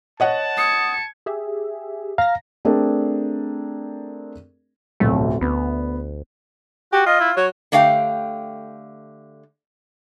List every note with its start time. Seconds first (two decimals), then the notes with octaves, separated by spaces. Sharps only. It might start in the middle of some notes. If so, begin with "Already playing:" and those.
0.20 C#5 D#5 F#5 A5
0.57 D#6 G#6 C#7
1.26 G4 G#4 E5
2.18 F5 A#5 A#6
2.65 A3 C4 D4 G#4 A#4 D5
5.00 D1 B1 F2 A3
5.41 D2 B3
6.93 F#4 G4
7.06 F4 D#5
7.20 E4
7.37 F#3 C#5
7.72 D3 A3 G4 F5 G5